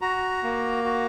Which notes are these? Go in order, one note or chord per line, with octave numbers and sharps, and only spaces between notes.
F#4 A#5
A#3
F#4